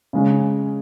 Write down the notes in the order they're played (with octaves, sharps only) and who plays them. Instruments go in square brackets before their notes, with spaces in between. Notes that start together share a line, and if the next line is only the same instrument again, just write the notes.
[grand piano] C#3 G#3 C#4